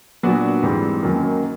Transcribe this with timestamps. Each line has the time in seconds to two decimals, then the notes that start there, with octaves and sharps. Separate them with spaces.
0.23 A#2 F#3 B3 D4 F#4
0.63 G#2 E3 G3 C4
1.03 F#2 D#3 F#3 A#3